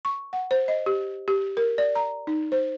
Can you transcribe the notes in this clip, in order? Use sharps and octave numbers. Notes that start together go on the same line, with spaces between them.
C#6
F#5
C5
D#5
G4
G4
A#4
D5
A#5
D#4
C5